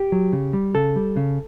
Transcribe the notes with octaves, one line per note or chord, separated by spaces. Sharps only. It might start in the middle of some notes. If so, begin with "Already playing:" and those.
Already playing: G4
F#3
C#3
G3
C#3 A4
G3
C#3